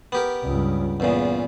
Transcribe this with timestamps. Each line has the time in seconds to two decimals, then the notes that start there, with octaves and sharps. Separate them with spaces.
0.12 B3 G4 A#4
0.44 C#2 G2
1.00 E2 A#2 C#3 B3